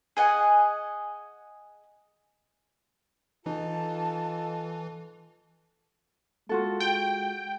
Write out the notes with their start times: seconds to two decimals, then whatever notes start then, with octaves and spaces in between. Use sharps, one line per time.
0.17 G#4 D#5 F#5 G#5
3.46 E3 D#4 F4 A4 A5
6.49 G#3 F4 F#4 A4
6.80 G5